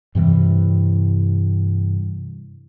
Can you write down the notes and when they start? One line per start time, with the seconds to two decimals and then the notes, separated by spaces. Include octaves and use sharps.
0.15 G2 C3 E3 G3